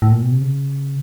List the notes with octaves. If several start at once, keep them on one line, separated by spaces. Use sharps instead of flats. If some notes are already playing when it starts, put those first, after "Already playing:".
A2
A#2
B2
C3
C#3